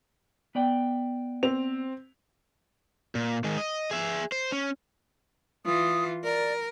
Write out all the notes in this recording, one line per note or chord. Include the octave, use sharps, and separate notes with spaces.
B3 D5 G5
C4 F7
A#2
D#3 G#3
D#5
G#4 E5
C5
C#4
E3 F4 D#6
A#4 D5